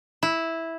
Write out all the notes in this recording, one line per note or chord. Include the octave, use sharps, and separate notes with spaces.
E4